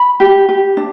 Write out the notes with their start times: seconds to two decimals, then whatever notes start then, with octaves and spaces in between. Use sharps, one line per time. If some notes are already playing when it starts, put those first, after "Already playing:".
Already playing: B5
0.20 G4
0.49 G4
0.77 D4